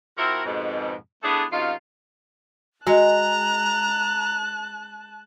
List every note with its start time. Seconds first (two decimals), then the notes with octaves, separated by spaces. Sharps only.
0.18 F3 C4 E4 F#4 A#4
0.45 F2 G#2 B2
1.23 A3 B3 D4 E4 G#4 A4
1.51 F#2 C3 D#4 F4
2.87 G#3 F#4 D#5 A5 A#5 F#6